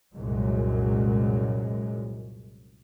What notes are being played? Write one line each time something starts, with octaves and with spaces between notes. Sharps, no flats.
C2 F#2 A#2 F#3 G#3